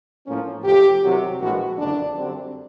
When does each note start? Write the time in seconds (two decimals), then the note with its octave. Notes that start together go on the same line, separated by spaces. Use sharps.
0.26 A2 F3 A#3 C#4
0.64 F2 C3 F3 A3 G4
1.03 C2 C3 D#3 F#3
1.41 A#1 A2 E3 G#3 F#4
1.78 F#1 F2 D3 D4
2.17 F#2 D3 G3 C4